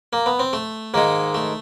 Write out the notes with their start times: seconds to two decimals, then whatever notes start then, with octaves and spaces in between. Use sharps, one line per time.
0.13 A#3
0.26 B3
0.39 C4
0.53 A3
0.94 G#2 D#3 G#3 A#3
1.34 A3